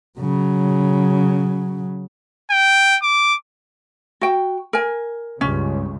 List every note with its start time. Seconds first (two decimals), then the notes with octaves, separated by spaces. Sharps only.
0.19 C#3 F#3
2.51 G5
3.03 D6
4.21 F#4 G5
4.73 A#4 G#5
5.41 C#2 G2 C#3 C#4